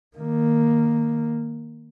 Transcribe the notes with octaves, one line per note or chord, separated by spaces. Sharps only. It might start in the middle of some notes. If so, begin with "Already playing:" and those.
D#3 A#3